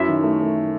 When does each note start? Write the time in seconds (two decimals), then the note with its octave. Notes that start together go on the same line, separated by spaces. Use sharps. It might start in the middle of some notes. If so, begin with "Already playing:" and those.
Already playing: F#2 E4 E5
0.08 D#3
0.24 A3
0.40 A3